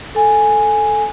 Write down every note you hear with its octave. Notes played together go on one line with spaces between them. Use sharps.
A4 G#5